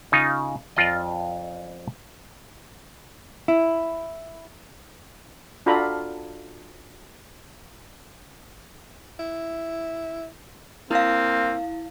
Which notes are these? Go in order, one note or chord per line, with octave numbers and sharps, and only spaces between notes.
C#3 D#4 F4
F2 F4 D5 D#5
E4
D4 F4 F#4 A4 A#5 B5
E4
A#3 C4 E4 F5